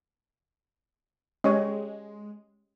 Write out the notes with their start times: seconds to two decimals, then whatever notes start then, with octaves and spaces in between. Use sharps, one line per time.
1.44 G#3 C#4 G4 C#5